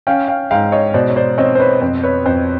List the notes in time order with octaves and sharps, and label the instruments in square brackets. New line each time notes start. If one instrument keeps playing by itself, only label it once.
[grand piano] C#4 F5 G5
F5 G5
G#2 F5 G5
C#5 D#5
B2 C5 D5
C#5
C5 D5
C4 C#5 D#5
C5
B4 C#5
F2 C5
B4 C#5
F2 C5